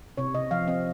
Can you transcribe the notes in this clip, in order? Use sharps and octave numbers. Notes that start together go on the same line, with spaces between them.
C3 C#5
C3 D#5
F3 F5
C4 D#5